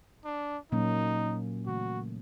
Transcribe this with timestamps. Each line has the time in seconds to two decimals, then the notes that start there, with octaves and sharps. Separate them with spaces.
0.25 D4
0.72 A#2 F#3 A#3 C#4 D#4
1.66 C#3 E3 A3 F#4